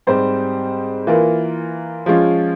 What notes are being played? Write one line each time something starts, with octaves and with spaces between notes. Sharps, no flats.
G#2 G3 C4 G4 C5
E3 A#3 F4 A#4
F3 G#3 C#4 F4